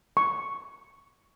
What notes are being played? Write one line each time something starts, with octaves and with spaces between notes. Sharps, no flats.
C#6